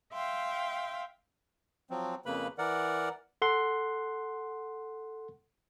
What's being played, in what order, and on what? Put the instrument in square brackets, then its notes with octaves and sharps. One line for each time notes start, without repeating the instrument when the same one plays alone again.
[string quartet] E5 F5 G5 C6
[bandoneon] F3 F#3 C4
F2 C#3 A#3 B4 B5
E3 A#4 D5 F#5
[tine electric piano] A4 F#5 C6